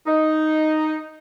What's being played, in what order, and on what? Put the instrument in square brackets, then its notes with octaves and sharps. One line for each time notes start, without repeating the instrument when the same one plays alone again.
[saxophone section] D#4